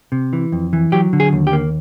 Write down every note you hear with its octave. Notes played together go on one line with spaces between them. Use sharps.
C3
E3
F2
E3
F#3 G4
D3
G#4
D#2
G4
A#3